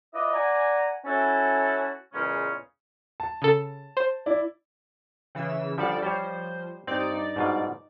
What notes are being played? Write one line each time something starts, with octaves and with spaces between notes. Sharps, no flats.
E4 F4 B4 D5 D#5
D5 F#5 G#5 A#5
C#4 E4 F#4 A4
E2 A#2 C#3 G#3 C#4
A5
C#3 A4
C5
E4 D5
C#3 E3 E6
D3 F3 G3 A4 D5
F3 G3 C5 C#5
G2 C4 D#4 D5
G#2 B2 F4